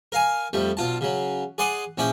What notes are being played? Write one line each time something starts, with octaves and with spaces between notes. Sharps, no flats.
A#4 F5 G#5
F2 G3 A3
B1 F4 A5
C#3 F#3
G#4 D5 F#5 C6 D#6
A#1 C#4 E4 D5 G5